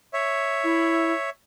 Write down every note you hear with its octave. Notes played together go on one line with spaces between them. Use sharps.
C#5 E5
E4